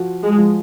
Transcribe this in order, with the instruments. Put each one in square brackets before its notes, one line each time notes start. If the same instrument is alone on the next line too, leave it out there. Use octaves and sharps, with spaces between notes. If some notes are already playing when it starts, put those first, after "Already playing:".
Already playing: [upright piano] F3 F#4
[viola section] G#3
[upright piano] F3